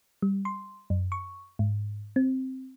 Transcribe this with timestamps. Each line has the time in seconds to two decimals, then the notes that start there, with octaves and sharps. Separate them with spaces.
0.22 G3
0.45 C6
0.90 F#2
1.12 C#6
1.59 G#2
2.16 C4